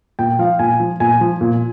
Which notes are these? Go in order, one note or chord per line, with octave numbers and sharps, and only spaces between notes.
A#2 G5
F3 F5
A#2 G#5
F3
A#2 G#5
F3
A#2